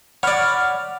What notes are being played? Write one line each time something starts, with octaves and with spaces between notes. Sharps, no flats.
C#5 D5 F#5 B5 F6